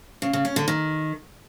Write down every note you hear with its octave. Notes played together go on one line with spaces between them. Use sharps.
C#3
C#3
C#4
D3
D#3